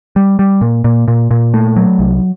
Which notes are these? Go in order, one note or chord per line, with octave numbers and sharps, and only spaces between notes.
G3
G3
A#2
A#2
A#2
A#2
A3
F#3
C2